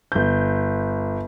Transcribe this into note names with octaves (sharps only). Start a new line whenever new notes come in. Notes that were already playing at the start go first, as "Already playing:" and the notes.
G1 G6